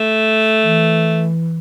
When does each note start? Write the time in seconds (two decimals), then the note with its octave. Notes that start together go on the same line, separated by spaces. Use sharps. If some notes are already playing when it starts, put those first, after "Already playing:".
Already playing: A3
0.63 E3